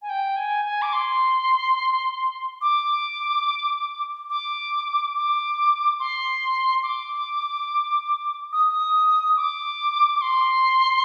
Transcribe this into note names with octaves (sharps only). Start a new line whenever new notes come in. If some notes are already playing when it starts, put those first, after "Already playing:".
G#5
G5
G#5
G#5
D6
C6
D6
D6
D6
C6
D6
D#6
D#6
D6
D6
C6